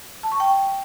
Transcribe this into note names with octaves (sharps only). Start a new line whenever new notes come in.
A5
C#6
G5